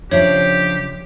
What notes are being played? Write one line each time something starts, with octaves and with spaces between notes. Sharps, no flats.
C#3 F3 D4 G4 C#5 E5